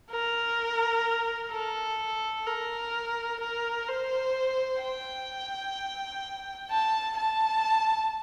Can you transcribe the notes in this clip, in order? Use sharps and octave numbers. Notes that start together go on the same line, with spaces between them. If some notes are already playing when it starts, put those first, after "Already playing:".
A#4
A4
A#4
A#4
C5
G5
A5
A5